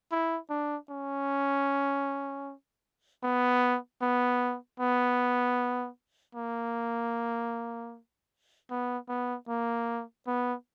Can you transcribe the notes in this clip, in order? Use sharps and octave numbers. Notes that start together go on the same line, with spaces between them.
E4
D4
C#4
B3
B3
B3
A#3
B3
B3
A#3
B3